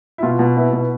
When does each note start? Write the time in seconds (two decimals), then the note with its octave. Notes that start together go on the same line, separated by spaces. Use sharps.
0.18 E4
0.23 B2 F4
0.39 B2
0.57 B3 E4
0.73 B2